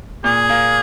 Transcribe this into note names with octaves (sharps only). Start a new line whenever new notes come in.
A#2 G#4
A#3